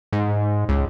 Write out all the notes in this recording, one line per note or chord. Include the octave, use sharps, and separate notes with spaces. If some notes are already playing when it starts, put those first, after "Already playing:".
G#2
C#2